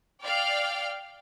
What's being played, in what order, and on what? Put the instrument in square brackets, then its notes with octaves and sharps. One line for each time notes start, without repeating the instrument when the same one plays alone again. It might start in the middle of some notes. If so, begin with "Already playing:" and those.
[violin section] D5 F5 G5 F6